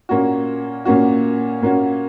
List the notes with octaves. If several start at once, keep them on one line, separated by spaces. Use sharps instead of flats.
A#2 A#3 C#4 F#4
A#2 A#3 C#4 F#4
A#2 A#3 C#4 F#4